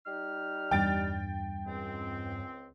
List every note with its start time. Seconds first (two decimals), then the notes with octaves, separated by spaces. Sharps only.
0.06 G3 D#4 F6
0.71 E2 G2 G5 A6 D7
1.66 C#2 C4